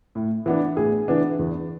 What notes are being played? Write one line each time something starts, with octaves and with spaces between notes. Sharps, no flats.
A2
E3 B3 D4
A2 G#4
E3 B3 D4
E2